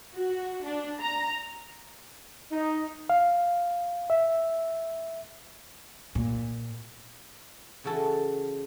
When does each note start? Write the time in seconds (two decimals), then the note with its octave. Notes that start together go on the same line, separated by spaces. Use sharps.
0.15 F#4
0.64 D4
1.00 A#5
2.52 D#4
3.10 F5
4.10 E5
6.15 A#2
7.84 C#3 E3 F#4 A4